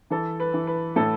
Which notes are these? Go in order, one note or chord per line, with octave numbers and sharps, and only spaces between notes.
E3 A4
B4
E3
B4
A2 A4